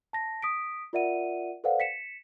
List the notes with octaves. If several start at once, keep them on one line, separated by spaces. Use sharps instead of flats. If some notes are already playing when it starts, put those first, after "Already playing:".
A5 A#6
D#6 B6 D7
F4 A#4 D5 E5 F#5 D#7
A4 B4 C5 D5 F5 F#5
B6 C#7 E7